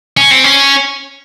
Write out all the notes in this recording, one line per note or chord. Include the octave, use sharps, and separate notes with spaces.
C#4
C4
C#4